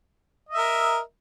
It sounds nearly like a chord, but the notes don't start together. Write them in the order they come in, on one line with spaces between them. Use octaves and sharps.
D#5 E5 A#4